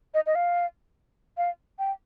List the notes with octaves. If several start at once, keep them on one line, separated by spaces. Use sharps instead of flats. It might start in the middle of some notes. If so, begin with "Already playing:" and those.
D#5
D#5
F5
F5
G5